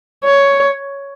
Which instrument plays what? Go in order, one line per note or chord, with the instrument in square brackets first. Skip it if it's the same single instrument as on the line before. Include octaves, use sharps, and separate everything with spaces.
[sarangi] C#5